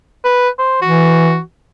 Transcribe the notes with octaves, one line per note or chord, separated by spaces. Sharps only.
B4
C5
E3 F#4